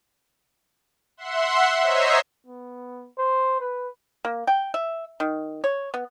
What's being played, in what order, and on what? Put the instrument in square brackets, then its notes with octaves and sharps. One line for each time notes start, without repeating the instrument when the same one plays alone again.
[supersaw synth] E5 F#5 C6
C5 C#5 D#5 E5 A#5 C7
[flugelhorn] B3
C5
B4
[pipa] A#3
G5
E5
D#3
C#5
B3